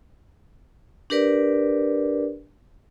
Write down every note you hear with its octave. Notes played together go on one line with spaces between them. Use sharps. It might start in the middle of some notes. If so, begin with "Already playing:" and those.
D4 G4 A#4 B4 D5